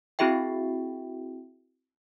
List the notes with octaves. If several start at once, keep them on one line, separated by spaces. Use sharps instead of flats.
C4 E4 F#4 G#4 E5 G5